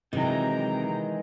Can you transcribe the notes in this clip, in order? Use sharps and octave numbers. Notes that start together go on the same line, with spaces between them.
C3 D#3 E3 F#3 G#3 G5 A#5